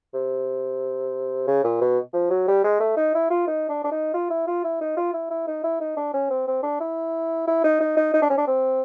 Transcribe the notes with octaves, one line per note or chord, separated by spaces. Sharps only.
C3
C#3
A#2
B2
F3
F#3
G3
G#3
A3
D#4
E4
F4
D#4
D4
D4
D#4
F4
E4
F4
E4
D#4
F4
E4
E4
D#4
E4
D#4
D4
C#4
C4
C4
D4
E4
E4
D#4
D#4
D#4
D#4
D4
C#4
D4
C4